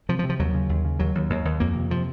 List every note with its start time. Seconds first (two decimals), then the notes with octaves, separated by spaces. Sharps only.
0.09 C3 F3
0.19 F3
0.24 C3
0.29 F3
0.39 D#2 F#3
0.54 C#3
0.69 D#2
0.85 C#3
0.99 D#2 F#3
1.15 D#2
1.30 D#2
1.45 D#2
1.60 F2 A#3
1.75 C3
1.90 C3 F3